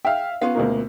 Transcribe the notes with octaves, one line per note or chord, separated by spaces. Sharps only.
E5 F5 G5
B3 C#4 F4 F5
D2 B2 A#3